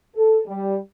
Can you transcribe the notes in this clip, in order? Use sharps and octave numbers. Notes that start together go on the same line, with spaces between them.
A4
G3